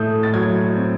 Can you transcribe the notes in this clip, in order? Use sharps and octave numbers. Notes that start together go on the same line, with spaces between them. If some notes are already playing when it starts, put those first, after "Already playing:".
Already playing: A2 A3 D#6 G6
A6
F#3 G#6
C4